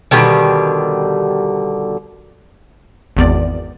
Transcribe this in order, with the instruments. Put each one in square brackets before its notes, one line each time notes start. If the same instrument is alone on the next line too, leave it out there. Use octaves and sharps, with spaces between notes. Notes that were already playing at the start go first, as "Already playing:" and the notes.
[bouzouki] B2 D3 D#3 G3
[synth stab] G#1 E2 D5